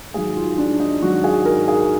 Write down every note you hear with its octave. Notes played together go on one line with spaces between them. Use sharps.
G#2 D#3 F#3 G#4
F4
D4
D#4
G#2 D#3 F#3 F#4
G#4
A#4
G#4